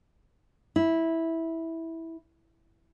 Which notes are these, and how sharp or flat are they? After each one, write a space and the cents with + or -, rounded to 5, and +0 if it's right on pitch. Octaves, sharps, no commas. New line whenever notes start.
E4 -10